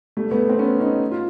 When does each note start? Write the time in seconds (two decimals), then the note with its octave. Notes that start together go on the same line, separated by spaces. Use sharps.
0.17 G3 A3
0.31 A3 B3
0.49 C4
0.59 B3 C#4
0.80 C#4 D#4
1.11 F4